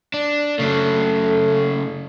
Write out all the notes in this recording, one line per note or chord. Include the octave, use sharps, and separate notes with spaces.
D4
C#3 F#3 A3